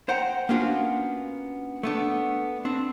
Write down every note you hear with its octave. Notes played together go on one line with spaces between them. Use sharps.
C5 F#5 G5 A#5
A#3 B3 C#4 D4 F4 F#4
A3 B3 D4
C4 D4